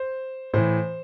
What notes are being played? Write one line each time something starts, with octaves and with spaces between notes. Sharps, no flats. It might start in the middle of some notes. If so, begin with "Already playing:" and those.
Already playing: C5
A2 E3 C5